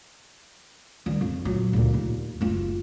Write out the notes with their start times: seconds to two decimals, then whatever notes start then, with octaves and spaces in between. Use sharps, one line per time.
1.06 D#3 G3
1.21 F2
1.45 A#2 F#3
1.73 C#2 A#2
1.94 D#2
2.41 F#1 F4